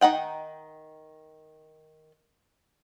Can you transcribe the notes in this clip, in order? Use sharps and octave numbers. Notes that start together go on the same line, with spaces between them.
D#3 D#4 F#5 G5